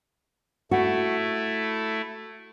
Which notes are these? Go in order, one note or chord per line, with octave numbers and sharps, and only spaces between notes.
A3 E4 F#4